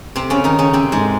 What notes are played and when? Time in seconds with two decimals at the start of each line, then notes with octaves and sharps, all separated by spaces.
0.16 C3 C4
0.30 C#3 C#4
0.44 D#3 D#4
0.59 C#3 C#4
0.73 C3 C4
0.92 G#2 G#3